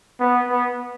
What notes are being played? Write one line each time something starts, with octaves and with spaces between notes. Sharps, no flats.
B3
B3